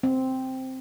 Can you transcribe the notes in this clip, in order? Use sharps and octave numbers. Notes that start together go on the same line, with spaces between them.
C4